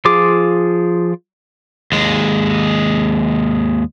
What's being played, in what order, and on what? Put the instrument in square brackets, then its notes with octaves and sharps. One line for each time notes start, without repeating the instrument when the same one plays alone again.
[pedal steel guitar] F3 F4 G#4 D6
[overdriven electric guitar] D#2 G#3